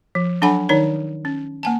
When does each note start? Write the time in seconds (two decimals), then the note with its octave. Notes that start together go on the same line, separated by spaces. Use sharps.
0.15 F3
0.42 F#3 D4 A4 F#5 G#5 B5
0.69 D#3 D#4 C#5 D5
1.25 C#4
1.63 A#3 G#5 A5